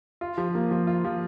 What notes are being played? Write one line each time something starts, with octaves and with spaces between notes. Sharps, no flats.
F4
F3
A#3
F3
F4
F3